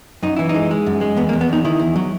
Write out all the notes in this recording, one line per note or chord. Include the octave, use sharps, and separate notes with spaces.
F#2 D#4
E3 E4
D#4
G#3
G#3
F#2
G#3
E2 B3
A#3
E2
B3
E2 D#4
D#3 E4
E2
F#3